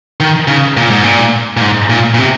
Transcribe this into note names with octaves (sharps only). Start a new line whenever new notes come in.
D#3
C#3
A#2
G#2
A#2
A#2
G#2
A#2
A#2
C3